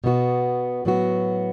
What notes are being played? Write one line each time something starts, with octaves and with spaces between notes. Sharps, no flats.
B2 B3 F#4
A2 F#3 B3 F#4